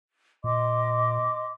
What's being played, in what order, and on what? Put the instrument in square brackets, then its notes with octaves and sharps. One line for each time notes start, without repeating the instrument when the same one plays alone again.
[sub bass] A#2 [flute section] D#5 C6 D6